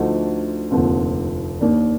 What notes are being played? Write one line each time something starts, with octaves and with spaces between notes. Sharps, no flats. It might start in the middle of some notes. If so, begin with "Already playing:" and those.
Already playing: D2 D3 F3 A3 D#4
F1 D#2 D3 F3 C4
D#2 D#3 A#3 D4